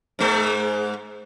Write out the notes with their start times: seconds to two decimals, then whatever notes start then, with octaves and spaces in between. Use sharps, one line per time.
0.19 G#2 G#3 C5